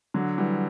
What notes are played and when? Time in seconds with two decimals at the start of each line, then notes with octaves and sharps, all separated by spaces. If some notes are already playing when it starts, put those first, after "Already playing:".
0.14 D3 F#3
0.38 E3 G3